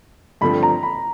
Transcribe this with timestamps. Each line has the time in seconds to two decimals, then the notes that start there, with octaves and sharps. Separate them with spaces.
0.41 G2 D3 F3 A3 C4 B5
0.63 A#5
0.83 B5